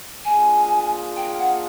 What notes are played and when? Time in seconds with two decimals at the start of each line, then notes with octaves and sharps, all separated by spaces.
0.24 A#3 D4 F4 G#4 G#5
1.16 G5
1.38 F#5